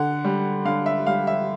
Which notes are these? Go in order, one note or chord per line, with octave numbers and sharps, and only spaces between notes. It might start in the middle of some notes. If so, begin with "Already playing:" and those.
Already playing: D3 F#5
G3
D3 F5
E5
G3 F5
E5